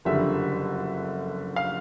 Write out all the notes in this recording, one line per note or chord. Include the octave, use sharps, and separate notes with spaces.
F#1 F2 D3 G3 E5
F5